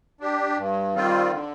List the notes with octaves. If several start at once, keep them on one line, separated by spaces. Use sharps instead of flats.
D4 G4
G2
D#3 G3 C4 F4
D3